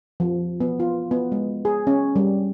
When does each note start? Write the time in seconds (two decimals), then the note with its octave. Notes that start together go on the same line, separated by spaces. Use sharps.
0.20 F3
0.61 B3
0.80 F4
1.11 B3
1.32 G#3
1.65 G#4
1.87 C#4
2.16 G3